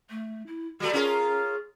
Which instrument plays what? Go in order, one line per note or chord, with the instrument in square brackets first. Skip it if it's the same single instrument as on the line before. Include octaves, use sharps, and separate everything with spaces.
[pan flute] A3
E4
[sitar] G3 A3 [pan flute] F#4
[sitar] C#4 F4 A#4 [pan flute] G#4